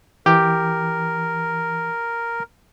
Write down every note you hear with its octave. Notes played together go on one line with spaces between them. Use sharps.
E3 G4 A#4